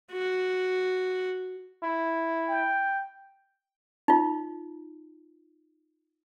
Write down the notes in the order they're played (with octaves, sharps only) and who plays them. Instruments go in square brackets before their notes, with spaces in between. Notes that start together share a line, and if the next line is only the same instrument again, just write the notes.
[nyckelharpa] F#4
[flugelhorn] E4
[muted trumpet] G5
[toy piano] D#4 F4